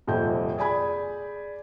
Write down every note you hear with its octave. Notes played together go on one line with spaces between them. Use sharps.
D#1 F2 C3 G6
G#4 D5 G#5 B5 G#6